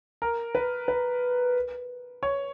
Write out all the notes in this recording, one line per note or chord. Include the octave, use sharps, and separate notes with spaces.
A#4
B4
B4
C#5